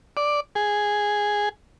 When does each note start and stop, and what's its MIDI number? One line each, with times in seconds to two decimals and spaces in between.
0.17 0.40 74
0.55 1.49 68